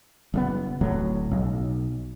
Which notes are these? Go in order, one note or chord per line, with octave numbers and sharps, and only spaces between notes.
F#1 C#3 B3
D1 A2 F#3
B1